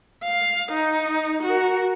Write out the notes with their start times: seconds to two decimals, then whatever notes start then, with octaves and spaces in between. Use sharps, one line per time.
0.24 F5
0.71 D#4
1.42 F#4 A#4